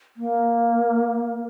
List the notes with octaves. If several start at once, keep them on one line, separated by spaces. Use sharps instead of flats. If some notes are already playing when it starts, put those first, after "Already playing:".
A#3